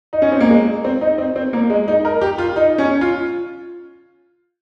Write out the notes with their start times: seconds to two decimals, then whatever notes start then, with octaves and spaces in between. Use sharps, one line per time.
0.13 D#4
0.22 C#4
0.32 C4
0.40 A#3
0.50 G#3
0.85 C4
1.01 D#4
1.18 C4
1.36 C4
1.53 A#3
1.70 G#3
1.88 D#4
2.05 A#4
2.21 G4
2.38 F4
2.56 D#4
2.78 C#4
3.01 F4